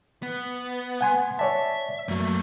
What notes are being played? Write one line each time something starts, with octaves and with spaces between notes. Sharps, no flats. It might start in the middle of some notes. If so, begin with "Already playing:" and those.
B3
F#5 G#5 C6
C#5 D5 E5 A5
F#2 F#3 A3 A#3